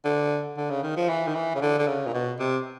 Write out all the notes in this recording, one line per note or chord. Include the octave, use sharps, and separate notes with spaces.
D3
D3
C#3
D#3
F3
E3
D#3
E3
C#3
D3
D3
C#3
A#2
B2
C3